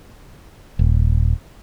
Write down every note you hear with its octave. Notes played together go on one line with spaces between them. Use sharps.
D#1